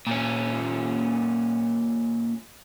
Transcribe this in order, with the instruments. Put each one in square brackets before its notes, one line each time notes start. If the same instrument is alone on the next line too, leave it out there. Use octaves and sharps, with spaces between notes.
[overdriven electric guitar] A#2 C#4